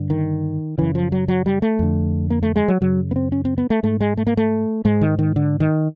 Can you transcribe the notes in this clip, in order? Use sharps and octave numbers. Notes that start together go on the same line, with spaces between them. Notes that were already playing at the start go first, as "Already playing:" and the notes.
Already playing: G2 D3
D#3
F#2 C#3 E3
F3
F#3
F#3
G3
A3
F2 D3
A#3
A3
G#3
F#3
F#2 C#3 F#3
B3
C4
C#4
C4
B3
A3
G#2 A3
G#3
A3
A#3
A3
G#2 G#3
D#3
D#3
D3
D#3